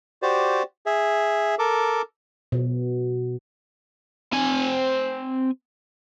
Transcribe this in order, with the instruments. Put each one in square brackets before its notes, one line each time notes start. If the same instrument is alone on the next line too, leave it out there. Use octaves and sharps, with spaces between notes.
[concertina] F#4 G4 C5 D5
G#4 E5
A4 A#4 D6
[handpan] B2
[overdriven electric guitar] C4 G#5